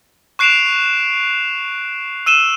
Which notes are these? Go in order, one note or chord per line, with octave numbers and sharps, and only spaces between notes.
C#6 F#6 C7 D7 E7 F7
E6 D#7 E7 G7